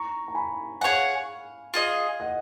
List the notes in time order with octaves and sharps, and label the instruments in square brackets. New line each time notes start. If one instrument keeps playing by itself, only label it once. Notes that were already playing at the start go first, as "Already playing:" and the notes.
Already playing: [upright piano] A#5 C#6
A#5
G#5 B5
[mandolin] G#4 C#5 F#5 [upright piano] F5 G#5
[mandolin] F4 G#4 D#5
[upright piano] D#5 F#5